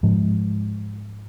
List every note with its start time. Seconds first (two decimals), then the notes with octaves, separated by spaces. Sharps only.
0.03 G#2 F3